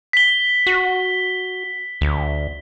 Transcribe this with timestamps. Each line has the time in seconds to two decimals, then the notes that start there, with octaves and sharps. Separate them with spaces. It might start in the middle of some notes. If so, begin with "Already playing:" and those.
0.13 B6 G7
0.67 F#4
2.01 D2